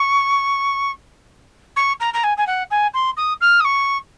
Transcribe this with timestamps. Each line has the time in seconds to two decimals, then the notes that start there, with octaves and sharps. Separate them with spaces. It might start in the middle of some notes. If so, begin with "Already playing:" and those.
Already playing: C#6
1.76 C#6
2.00 A#5
2.13 A#5
2.23 G#5
2.37 G#5
2.47 F#5
2.71 G#5
2.94 C6
3.17 D#6
3.41 F6
3.60 D#6
3.64 C#6